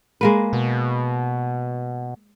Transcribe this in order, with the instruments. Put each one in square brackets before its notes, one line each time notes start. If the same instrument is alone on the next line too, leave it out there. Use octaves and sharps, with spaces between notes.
[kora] G#3 A#3 B4
[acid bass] B2